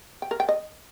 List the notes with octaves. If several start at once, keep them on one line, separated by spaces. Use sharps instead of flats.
G5
A#4
G5
D#5